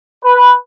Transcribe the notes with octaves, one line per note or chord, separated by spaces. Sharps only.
B4